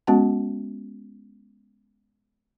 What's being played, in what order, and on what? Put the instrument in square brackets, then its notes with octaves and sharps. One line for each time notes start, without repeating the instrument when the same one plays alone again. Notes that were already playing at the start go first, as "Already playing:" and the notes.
[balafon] G#3 B3 C#4 F#4 F#5 A5